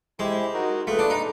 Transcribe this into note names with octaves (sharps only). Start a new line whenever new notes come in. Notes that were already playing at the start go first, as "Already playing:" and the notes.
G#3 E4 G4 C5
D#4 F#4 A#4
A3 F4 G#4 B4
D4
D#4